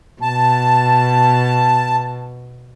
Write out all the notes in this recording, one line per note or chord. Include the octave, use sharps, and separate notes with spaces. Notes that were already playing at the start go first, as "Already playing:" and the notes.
B2 A5